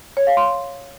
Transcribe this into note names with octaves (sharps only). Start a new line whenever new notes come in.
C#5
F5
C6